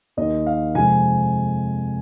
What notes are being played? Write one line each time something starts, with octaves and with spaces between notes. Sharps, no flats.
D#2 D#3 A#3 D#5
F5
F2 C3 G#3 C4 G#5